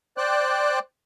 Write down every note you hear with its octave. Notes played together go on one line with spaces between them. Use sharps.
C5 D5 G5 F#6